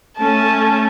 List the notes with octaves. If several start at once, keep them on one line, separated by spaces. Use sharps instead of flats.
A3 C#4 A5